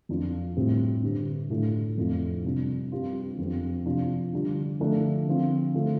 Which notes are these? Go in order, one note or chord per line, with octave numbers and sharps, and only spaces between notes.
F2 F3 D4 F4
A2 G3 C4
G2 D3 G3
A2 A3 D4 F4
F2 F3 A3 D4 F4
C3 G3 D4
G2 G3 C4 F4
F2 F3 C4
C3 F3 D4 F4
D3 G3 D4 F4
D3 F3 A3 D4
D3 F3 C4 F4
D3 A3 F4